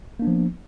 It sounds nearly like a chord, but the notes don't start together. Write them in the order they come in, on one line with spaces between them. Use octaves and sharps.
A#3 D4 B3 F3